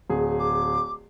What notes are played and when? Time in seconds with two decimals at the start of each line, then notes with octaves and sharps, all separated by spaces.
0.10 D1 G#4
0.39 D6